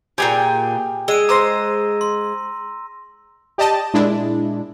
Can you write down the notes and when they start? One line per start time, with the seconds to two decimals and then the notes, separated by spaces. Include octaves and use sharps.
0.18 A#2 B3 G4 G#4 G5 G#5
1.08 G#3 E6 D#7
1.29 C5 A#5 D6 E6 A#6
2.01 C6
3.58 G4 D5 D#5 A5
3.94 A#2 G#3 D4 E4